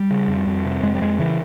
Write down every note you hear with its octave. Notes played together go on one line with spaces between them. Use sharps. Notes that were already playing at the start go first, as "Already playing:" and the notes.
Already playing: G3
C#3
F2
F2
C3
F2 G#3
G3
F2 G#3
C#3 E3